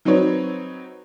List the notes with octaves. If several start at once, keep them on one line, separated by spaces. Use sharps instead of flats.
F#3 C4 D#4 B4 C#5